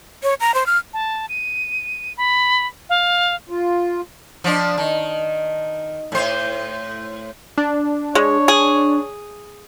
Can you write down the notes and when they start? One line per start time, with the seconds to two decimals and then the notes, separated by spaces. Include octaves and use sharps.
0.23 C#5
0.40 A#5
0.54 C5
0.66 F6
0.93 A5
1.29 D#7
2.17 B5
2.90 F5
3.49 F4
4.44 F3 D4
4.78 D#3
6.12 A2 C5
7.58 D4
8.15 G#3 C#5
8.48 G#4